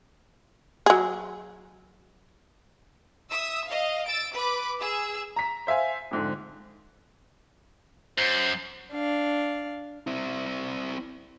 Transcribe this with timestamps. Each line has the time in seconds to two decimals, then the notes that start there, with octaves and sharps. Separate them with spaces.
0.86 F#3 G#4
3.29 E5 D#6 E6
3.67 D#5 F5
4.05 E6 A6 D7
4.34 B4 B5 D6
4.80 G#4 E6
5.36 A#5 B6
5.67 C5 E5 F5 G#5
6.11 F2 G#2 D3
8.18 F#2 C5
8.91 D4 F5
10.07 C4 E4